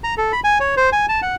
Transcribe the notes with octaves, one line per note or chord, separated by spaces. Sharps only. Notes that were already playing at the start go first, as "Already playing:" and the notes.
A#5
A4
B5
G#5
C#5
C5
G#5
A5
F#5